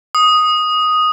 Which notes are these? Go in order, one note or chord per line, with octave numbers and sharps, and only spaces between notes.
D#6